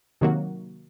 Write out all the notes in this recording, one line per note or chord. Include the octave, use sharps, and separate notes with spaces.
C3 D#3 F#3 A#3 F#4